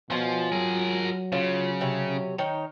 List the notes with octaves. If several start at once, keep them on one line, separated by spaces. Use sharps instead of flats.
B2 F3 C#4 F4 G#5
F#3 G#4 A#4
C#3 F4 C#5
C3 C#5
D#3 D#4 C#5